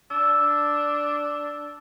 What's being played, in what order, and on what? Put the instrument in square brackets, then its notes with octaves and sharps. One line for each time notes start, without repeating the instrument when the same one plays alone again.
[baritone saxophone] D4 [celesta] E6